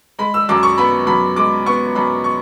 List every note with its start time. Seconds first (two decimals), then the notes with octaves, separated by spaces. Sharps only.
0.19 G#3 B5
0.34 E6
0.49 F#2 D6
0.63 C#6
0.78 B3 B5
1.07 F#2 B5
1.36 G#3 D6
1.66 B3 C#6
1.95 F#2 B5
2.24 C#6